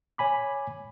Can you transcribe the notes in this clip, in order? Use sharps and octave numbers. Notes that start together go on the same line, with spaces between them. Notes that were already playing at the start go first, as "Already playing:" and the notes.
C#5 G#5 B5 D6